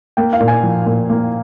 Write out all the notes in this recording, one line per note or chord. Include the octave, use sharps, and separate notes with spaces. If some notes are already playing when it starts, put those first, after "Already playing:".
A#3 G5
F5
A#2
G#5
F3
A#2
A#3